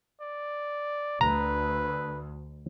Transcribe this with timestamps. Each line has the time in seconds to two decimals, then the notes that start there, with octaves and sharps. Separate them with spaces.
0.21 D5
1.21 D2 B4 A#5